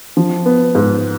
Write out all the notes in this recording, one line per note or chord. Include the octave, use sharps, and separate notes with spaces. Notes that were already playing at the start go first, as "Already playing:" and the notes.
F3
B3
G#2